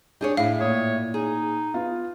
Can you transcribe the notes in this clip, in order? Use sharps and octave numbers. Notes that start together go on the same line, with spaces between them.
D4 G4 G#4 C#5
A2 E4 F5
A#2 C#5 D#6
D#4 G#4
B3 F4